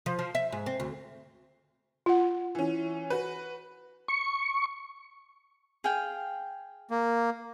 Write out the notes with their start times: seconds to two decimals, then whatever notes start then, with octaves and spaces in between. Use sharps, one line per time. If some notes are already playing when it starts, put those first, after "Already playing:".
0.06 F3
0.19 F3
0.35 E5
0.52 G#2
0.66 C4
0.80 D2
2.06 F4 F#5
2.55 E3 C#4
3.10 F#4 B4
4.08 C#6
5.84 G#4 F5 G5
6.91 A#3